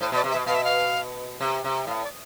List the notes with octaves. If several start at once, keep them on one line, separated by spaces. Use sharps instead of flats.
A2 C5
B2 D5
C3
E5
B2
B2 F5
E5
F5
C3
C3
A2 F5
D5